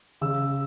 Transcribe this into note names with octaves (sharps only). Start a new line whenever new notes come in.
C#3 E6